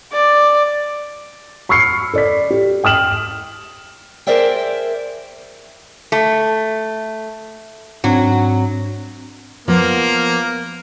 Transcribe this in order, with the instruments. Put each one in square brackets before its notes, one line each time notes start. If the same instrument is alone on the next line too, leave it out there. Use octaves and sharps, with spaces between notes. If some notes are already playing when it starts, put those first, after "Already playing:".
[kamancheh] D5
[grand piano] B5 C#6 E6 F6 C7 C#7
A4 D5 B6
G4
G5 D#6 F6 E7 F#7
[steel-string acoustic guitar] G#4 A#4 C5 D5 E5 G5
[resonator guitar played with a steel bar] A3
[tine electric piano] G#2 C4 D4 [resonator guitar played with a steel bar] F#3
[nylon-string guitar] F3 B3 [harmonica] A#3